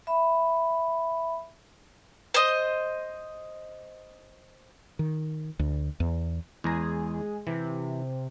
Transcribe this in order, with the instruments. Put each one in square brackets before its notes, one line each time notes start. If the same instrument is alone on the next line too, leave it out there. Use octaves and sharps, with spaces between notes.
[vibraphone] E5 B5
[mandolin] C5 D#5
[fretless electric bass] D#3
D2
E2
[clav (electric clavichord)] E2 A#5 [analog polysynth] G#3 G#4
[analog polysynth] C3 [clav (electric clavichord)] E3